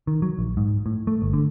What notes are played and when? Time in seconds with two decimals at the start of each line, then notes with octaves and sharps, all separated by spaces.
0.07 D#3
0.22 F#3
0.39 A#1
0.57 G#2
0.86 A2
1.07 A3
1.22 G1
1.33 D3